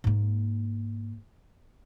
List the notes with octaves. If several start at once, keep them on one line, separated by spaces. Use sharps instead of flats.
G#2 A#3